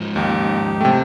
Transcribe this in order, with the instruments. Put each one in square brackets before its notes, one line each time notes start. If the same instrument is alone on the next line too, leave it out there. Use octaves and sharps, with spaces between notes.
[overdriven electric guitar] G#2 F3
[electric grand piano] D#2 [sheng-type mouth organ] D#4 G4
[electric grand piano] C3 A3 [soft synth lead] G5